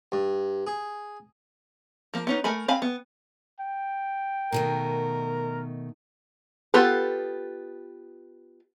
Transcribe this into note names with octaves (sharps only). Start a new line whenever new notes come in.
G2
G#4
F3 A#3
B3 C#4 D#4
A3 A#4 G#5 B5
C4 F5 G#5 B5
B3
G5
B2 D#3 A3 A#4
B3 F4 G4 A4 B4